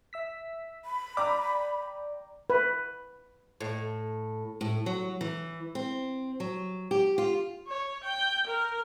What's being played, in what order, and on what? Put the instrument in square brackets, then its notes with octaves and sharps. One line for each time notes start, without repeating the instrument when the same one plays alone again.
[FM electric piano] E5 E6 B6
[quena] B5
[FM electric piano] D5 G5 [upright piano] A#5 D6
[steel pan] B4
[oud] A2
[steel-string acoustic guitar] A2
F#3
E3
C4
F#3
G4
F4
[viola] C#5
G5
A#4